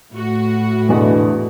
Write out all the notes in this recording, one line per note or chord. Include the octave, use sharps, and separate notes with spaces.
A2 F#4
E2 B2 D3 E3